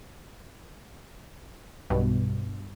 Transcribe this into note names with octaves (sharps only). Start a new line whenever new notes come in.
B1 G2 B2